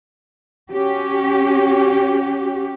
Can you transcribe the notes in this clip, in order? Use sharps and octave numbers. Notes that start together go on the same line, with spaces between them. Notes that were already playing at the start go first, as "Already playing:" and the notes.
C#4 F#4 G4